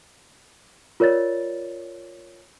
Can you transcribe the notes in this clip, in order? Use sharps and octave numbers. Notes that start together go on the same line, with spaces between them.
F4 A#4 C#5 D5 A6